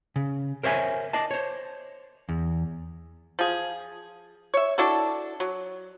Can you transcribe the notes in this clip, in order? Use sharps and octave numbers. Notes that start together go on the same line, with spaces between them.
C#3
A#4 C5 C#5 E5 G5 G#5
D5 D#5 A5
C5 C#5
E2
F3 G#4
C#5 E5
D4 E4 F#4 A4
F#3